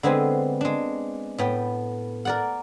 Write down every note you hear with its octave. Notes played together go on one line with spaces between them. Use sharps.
D3 G#3 B3 C4 G#5
G#3 D4
A2 B3 G5
A#4 D5 F#5